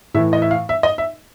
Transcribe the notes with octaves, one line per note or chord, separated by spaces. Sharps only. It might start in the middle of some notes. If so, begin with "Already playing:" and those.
A2 E3 E5
D#5
E5
F5
E5
D#5
E5